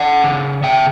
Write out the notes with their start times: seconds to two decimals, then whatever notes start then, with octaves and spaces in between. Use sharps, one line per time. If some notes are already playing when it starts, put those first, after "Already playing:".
Already playing: D5 F#5
0.24 C#3
0.63 C#3 E5 G5